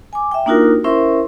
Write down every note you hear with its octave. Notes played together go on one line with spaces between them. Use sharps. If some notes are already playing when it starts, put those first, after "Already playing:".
G#5 D6
E5 G5
A#3 D4 D#4 F4 F#4 A#4
C#4 E4 A#4 C5 E5 C6